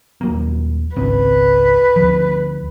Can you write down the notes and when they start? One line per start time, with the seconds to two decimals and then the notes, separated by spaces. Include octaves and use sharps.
0.21 D#1 F#3 A#3
0.96 G#1 C#2 C4 B4
1.96 D2 F3